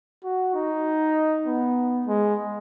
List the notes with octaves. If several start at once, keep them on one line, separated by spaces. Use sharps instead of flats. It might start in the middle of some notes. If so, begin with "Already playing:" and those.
F#4
D#4
B3
G#3